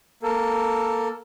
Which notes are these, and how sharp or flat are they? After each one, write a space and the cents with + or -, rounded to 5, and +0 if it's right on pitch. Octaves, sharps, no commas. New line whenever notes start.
A#3 +0 A4 +10